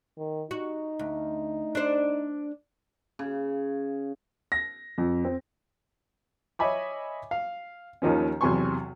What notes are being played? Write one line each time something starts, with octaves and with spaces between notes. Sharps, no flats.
D#3
D#4 F#4
D2
D4 C5
C#3
A#6
F2
C4
C#5 D#5 E5 G#5 B5 D6
F5
D#2 D#3 F3 C#4
B1 E2 C3 G#5 C6 C#6